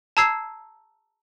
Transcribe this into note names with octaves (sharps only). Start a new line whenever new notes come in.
A5 A#5 E6 G#6 C7